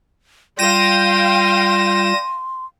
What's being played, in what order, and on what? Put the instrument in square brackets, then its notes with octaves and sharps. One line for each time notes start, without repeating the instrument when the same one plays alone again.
[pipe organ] G3 F4 [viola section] F5 G5 [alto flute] C6 [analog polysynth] A#6 D#7 E7